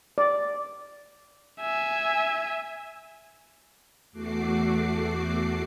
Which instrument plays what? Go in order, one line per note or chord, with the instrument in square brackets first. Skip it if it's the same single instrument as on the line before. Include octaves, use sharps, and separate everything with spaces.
[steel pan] D5
[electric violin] E5 G#5
[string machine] E2 A3 F#4 D6 C7